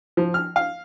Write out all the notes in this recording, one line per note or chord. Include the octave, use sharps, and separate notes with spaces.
F3
F6
F5